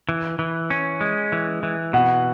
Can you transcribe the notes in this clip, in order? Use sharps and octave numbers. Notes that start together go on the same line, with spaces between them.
E3
E3
C#4
G#3
E3
E3
B2 F#5